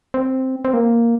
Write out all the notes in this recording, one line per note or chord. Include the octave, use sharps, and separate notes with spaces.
C4
C4
A#3